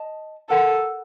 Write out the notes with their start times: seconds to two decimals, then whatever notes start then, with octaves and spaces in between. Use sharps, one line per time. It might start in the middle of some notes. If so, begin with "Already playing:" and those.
Already playing: D#5 A5
0.49 A4 A#4 F#5 A5